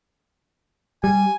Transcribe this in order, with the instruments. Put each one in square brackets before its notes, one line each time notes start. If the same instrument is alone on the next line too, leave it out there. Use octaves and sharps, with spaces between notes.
[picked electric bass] G3 [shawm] G#5